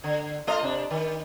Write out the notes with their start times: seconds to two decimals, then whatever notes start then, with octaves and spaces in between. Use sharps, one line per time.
0.04 D3
0.47 A3 F4 D#5
0.63 C3 D4
0.91 D#3